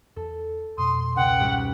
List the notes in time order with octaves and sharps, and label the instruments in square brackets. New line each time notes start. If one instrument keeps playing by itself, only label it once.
[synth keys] E2 [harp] A4
[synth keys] F2 B2 [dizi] C6 [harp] D#6
[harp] C#2 [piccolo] F#5 [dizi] G5
[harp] G#2 G3 F#4